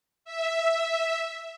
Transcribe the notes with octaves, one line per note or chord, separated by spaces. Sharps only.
E5